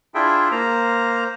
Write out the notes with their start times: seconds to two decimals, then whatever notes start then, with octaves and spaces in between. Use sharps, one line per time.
0.15 D4 E4 F4 G#4 E5 G5
0.51 A#3 C5 A#5